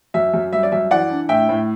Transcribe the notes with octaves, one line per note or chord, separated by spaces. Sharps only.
F#2 E5
F#2
G3 E5
D5
F#2 E5
E3 D5 F#5
D4
A2 E5 G5
A2